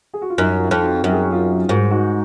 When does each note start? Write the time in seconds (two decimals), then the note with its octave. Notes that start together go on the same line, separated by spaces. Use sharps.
0.14 G#4
0.22 F#4
0.30 F4
0.38 F#2 D#4
0.59 F4
0.71 F2
0.81 D#4 F#4
1.03 F#2 A#4
1.12 G#4
1.23 F#4
1.31 F4 G#4
1.68 G#2 F#4 A#4
1.91 D#4 F#4